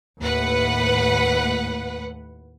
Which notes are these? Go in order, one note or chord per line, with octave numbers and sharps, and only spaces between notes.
D#2 A2 B4 F#5